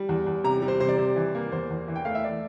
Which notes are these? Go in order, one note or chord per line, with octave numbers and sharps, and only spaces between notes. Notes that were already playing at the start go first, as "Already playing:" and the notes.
Already playing: G3
E2
E2
C3 A#5
G3
C5
C3 C5
D5
C3 C5
E3
A#3
E2 C5
E2
E3
G5
A3 F5
E5
D5